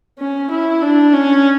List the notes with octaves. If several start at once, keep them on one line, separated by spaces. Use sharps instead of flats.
C#4
E4
D4
C#4